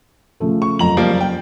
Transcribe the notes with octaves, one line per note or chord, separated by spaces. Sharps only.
C#3 F3 A3
C#6
F#1 F2 A#5 F#7
F3 G3 A#3
G5